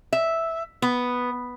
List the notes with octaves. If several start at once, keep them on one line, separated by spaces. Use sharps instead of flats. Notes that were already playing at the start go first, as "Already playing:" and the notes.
E5
B3